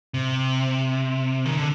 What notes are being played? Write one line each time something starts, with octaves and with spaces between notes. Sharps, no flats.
C3
D#3
D3